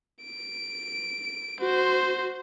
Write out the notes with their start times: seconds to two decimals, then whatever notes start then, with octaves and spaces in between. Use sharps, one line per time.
0.24 D7
1.61 F#4 C5